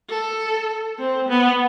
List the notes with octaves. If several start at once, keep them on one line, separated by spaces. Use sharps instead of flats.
A4
C4
B3